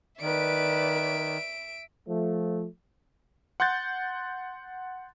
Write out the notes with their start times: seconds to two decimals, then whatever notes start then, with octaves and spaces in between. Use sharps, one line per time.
0.22 D#3 B4 D5 E5 D7
2.09 F3 A3
3.60 F#5 C6 F#6 G6 A6